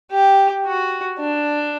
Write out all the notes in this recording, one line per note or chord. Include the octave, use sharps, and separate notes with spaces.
G4
F#4
D4